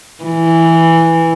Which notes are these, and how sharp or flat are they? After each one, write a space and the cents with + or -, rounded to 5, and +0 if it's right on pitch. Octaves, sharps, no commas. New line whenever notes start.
E3 +0